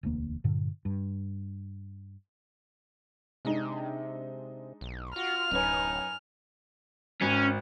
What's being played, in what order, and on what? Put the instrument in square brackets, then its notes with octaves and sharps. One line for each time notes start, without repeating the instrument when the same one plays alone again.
[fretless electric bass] E1 D2 A#3
G2 A#2 D3
G2
[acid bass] C3 [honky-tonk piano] G#3 D4 D#4
[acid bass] B1
[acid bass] F4 [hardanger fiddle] F#4 [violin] F6
[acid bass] D1 [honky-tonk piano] F#2 B4 C#5 [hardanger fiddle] D#4 G#5
[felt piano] G#1 [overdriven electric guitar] C#4